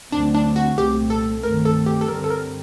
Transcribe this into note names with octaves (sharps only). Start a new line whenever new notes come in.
D2 D3 F#3 A3 C4 D4
D4
F#4
C2 A#2 A3 C4 G4
A4
G2 D#3 A3 C4 A#4
A4
G4
A4
G2 D3 G3 C4 A#4
A4
A#4